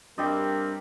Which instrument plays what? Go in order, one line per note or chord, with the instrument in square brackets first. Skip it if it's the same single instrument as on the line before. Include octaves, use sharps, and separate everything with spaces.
[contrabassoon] G2 [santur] G3 D5 D#5 [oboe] C4 [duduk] A#4